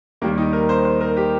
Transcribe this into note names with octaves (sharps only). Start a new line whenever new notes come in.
D#2 D#3 G3 A#3
D#4
A#4
C5
C5
A#4
G4